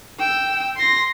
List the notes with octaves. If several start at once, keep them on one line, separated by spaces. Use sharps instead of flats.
G5 E6
C6 A#6